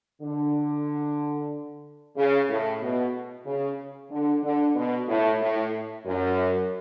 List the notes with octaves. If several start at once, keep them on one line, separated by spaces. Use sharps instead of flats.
D3
C#3
A2
B2
C#3
D3
D3
B2
A2
A2
F#2